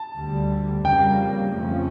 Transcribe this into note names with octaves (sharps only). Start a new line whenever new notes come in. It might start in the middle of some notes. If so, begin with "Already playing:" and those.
Already playing: A5
D2 D3 G3
F2 C#3 G3 A#3 G5
F2 C#3 F3 A3 C#4